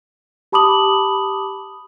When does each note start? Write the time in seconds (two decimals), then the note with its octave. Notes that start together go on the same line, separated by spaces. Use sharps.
0.52 G4 A5 B5 D6 D#6 F#7